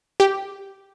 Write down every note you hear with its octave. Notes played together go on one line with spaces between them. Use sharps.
G4